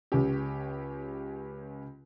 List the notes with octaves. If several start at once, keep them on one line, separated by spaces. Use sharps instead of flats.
C#2 C#4 G4